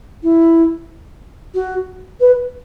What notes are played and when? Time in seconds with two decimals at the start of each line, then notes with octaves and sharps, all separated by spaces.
0.23 E4
1.54 F#4
2.20 B4